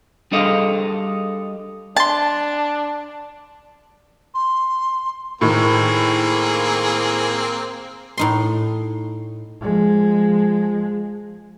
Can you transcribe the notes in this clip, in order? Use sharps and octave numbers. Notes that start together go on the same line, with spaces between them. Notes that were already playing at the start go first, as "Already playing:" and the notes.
G3 D4 G#4 A4 D#5 F5
D4 A5 C6 A6
C6
A2 D#3 A#3 C4 G#4
A2 D#4 C6
F3 G#3